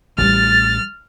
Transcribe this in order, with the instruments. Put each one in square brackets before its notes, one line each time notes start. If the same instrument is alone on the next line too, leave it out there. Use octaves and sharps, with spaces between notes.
[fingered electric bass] A1 [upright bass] E3 G3 [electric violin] F6 [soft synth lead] A6